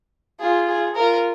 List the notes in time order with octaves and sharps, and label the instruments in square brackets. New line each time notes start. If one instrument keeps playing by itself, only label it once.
[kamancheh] F4 [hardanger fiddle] G#4
[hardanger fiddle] G#4
[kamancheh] F4 [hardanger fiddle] A#4